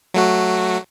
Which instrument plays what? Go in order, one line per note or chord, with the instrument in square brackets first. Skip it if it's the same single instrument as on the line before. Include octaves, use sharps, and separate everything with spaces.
[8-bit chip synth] F#3 A3 F#4